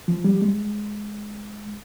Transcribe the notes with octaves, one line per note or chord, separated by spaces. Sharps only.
F3
G3
G#3